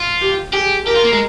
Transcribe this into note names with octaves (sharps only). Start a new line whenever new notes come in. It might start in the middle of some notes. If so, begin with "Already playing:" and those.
Already playing: F4
G4
G4 G#4
G4 A#4
F4
A#3
G#3